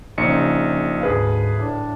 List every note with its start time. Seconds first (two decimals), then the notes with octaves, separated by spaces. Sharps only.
0.18 A#1 C#3 D#4 C#7
1.01 D2 G#2 G#4 B4 F5
1.56 A2 D4